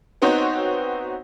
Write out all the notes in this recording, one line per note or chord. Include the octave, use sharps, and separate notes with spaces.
B3 C4 D#4 F#4 C5 C#5